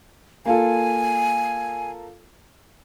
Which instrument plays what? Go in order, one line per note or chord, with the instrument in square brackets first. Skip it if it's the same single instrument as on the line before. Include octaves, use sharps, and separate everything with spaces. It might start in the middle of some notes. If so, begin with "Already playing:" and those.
[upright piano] A#3 F4 A4 [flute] G#5